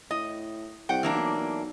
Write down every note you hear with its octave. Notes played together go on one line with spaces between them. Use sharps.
A2 D#5
C2 F#5 G5
E3 A#3 D4
B1
B1